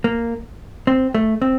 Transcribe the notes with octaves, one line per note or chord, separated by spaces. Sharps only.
A#3
C4
A3
C4